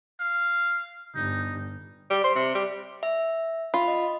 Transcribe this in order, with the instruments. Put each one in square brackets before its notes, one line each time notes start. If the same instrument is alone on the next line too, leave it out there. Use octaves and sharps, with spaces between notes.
[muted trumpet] F5
[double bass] G1 G2 [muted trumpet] D#4
[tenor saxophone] G3
C5
C3
G3
[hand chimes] E5
[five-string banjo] F4 [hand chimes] B5
[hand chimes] D#5